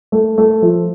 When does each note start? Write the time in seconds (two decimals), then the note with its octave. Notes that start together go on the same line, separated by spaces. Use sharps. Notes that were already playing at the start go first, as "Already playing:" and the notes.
0.12 A3
0.38 A3
0.62 F3